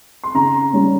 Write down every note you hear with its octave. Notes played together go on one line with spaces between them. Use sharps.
C6
C#3 A#5
G3 C#4